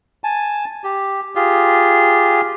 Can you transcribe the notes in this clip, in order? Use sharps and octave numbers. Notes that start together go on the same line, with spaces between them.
G#5 A5
G4
F4 G4 G#4